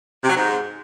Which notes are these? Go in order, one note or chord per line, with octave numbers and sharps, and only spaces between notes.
C3
F#3
G#2